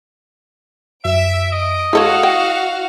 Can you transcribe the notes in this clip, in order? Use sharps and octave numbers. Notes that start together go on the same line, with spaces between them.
F#2 E5 D7
D#5
G#3 E4 F#4 A4 C#5 F5 F#5
G5